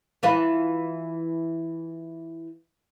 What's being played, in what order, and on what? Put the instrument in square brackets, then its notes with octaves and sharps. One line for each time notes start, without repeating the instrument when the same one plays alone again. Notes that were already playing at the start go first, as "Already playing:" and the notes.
[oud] E3 F4 B4